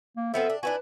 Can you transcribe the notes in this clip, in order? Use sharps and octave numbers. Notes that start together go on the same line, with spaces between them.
A#3
F3 B3 C4 A4 E5
D4
D4 E4 F#4 B4 G#5